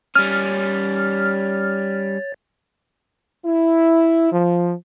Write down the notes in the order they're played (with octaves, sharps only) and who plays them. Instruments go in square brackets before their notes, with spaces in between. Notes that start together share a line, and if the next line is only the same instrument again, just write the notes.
[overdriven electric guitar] G3 C#4 [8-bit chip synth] C#5 A6 [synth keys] F6
[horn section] E4
F3